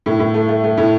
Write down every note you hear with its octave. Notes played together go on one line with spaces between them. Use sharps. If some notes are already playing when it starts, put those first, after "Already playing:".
A2
A2
A3
A3
A3
A2